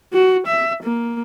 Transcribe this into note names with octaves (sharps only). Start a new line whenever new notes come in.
F#4
E5
A#3